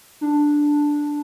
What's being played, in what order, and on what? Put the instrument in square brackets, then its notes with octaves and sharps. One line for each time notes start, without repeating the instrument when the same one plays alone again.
[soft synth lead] D4